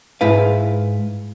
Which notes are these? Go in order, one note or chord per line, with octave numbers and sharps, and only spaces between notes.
G#2 E4 B4 F5